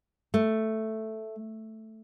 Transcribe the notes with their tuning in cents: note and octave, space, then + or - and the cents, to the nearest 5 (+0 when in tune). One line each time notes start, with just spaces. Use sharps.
A3 +0